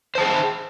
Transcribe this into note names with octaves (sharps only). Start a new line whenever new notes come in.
G#4 C5 A5